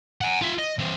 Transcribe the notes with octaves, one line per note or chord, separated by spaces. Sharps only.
F#5 G#5
F4 E5
D#5
E3 C4